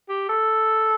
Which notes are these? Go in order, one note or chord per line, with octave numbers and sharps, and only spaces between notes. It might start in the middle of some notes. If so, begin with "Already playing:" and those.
G4
A4